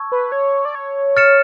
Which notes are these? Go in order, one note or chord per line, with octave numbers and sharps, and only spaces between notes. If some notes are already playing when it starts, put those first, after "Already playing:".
Already playing: A5 C#6 E6 G#6
B4
C#5
D5
C#5
F6 A6 C#7 E7